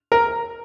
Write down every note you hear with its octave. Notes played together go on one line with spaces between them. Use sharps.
A#4